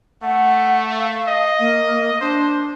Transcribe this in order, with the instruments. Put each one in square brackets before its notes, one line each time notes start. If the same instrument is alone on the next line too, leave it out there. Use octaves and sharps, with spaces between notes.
[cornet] A3 [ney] F#5
[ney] F5
[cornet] D#5
[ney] A#3
[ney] D4 [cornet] C5